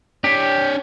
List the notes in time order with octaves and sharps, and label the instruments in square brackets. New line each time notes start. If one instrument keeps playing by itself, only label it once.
[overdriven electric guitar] D4 C#5 [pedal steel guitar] G4